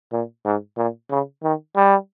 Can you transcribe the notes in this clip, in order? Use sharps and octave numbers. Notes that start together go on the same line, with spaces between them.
A#2
G#2
A#2
C#3
D#3
G3